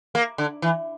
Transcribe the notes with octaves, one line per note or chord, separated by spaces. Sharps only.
A#3
D3
E3